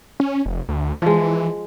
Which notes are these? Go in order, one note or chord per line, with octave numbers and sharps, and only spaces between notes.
C#4
F1
D2
E3 F3 G#3